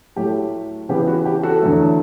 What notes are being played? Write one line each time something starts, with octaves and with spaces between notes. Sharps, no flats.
A2 F#3 A3 G4
C#3 E3 B3 G4
F#4
G4
F#4 A4
E2 D3 F#3 A3